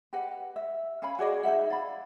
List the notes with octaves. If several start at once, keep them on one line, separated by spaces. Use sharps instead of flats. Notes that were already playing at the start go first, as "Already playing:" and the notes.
G4 B4 D#5 F#5
E5
C#4 F5 G#5 B5
F#4 G#4 D5 D#5
D#4 G#4 E5 F#5
D5 F5 B5